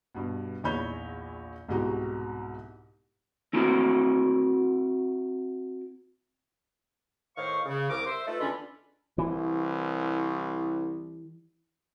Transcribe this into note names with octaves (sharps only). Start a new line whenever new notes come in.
G2 B2
A#1 E2 D#4 C#5 B5 G6
C2 G#2 B2 F#4 G4 A#5
C4 E4 F#4 A#4 A5 A#5
A2 D#3 C5 F5 C#6
C#3
C2 A#4 D6
C5 E5
A3 D#4 F4 A4 B4
E2 D3 C#4 D4 F4 B5
C2 E3